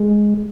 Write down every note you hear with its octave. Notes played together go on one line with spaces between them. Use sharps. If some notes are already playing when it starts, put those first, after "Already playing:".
Already playing: G#3